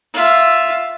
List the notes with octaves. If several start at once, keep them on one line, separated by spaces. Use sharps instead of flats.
F4 E5